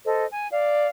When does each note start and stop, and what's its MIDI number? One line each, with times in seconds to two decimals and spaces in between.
0.05 0.25 69
0.05 0.25 72
0.05 0.25 75
0.33 0.49 80
0.52 0.89 74
0.52 0.89 77